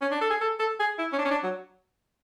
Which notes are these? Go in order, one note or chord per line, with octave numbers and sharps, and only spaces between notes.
C#4
D4
A4
G#4
A4
A4
G#4
E4
C#4
D4
C#4
D4
F#3